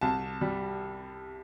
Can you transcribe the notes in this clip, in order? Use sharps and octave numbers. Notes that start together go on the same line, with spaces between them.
C2 A5
G3